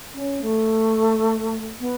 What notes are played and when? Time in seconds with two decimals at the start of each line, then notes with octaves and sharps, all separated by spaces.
0.14 C#4
0.42 A3
1.80 B3